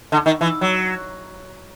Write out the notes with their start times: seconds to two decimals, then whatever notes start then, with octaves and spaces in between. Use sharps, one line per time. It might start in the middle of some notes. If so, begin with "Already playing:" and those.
0.12 D3
0.26 D#3
0.41 E3
0.61 F#3